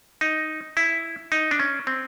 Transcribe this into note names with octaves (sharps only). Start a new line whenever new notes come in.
D#4
E4
D#4
D4
C#4
C4